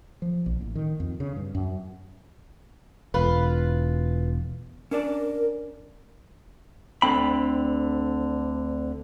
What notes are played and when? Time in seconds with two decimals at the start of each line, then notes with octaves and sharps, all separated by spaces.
0.22 F3
0.46 A#1
0.61 A1
0.75 D#3
1.00 F2
1.20 C#3
1.36 G2
1.55 F#2
3.14 E1 F4 B4
4.91 C#4 D4 A#4 D5
7.02 D2 D3 C4 B5